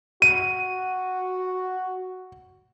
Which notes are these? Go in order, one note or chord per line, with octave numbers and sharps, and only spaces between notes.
F#4 D#7